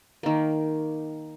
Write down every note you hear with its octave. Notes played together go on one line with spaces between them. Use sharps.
D#3 A#3